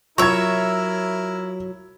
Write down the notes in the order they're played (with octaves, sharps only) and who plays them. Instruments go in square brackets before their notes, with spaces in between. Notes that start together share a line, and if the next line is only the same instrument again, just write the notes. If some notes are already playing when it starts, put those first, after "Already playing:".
[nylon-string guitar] F#3 [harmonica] E4 A#4 [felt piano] F4 G#6 [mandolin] C#5 E5